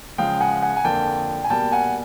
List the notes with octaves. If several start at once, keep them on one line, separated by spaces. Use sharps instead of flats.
C#3 F3 G#3 F5 G5
F#5 G#5
F#5 G#5
G#5
F2 D3 F3 A#3 G5 A5
G#5
B2 G3 A#3 G5 A5
F#5 G#5